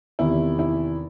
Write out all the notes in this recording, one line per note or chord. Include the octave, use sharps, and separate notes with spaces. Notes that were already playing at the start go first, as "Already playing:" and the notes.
E2 C3 D#3 E4
E4